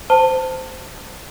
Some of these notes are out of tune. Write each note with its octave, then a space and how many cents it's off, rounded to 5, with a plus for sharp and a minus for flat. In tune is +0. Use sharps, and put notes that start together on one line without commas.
C5 -15 A5 +20